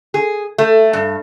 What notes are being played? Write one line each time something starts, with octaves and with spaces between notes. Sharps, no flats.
G#4
A3
G2